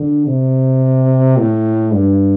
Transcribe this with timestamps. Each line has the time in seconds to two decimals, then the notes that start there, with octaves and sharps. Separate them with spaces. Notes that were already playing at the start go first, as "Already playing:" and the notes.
Already playing: D3
0.27 C3
1.38 A2
1.93 G2